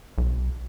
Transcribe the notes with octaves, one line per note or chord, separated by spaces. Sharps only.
B1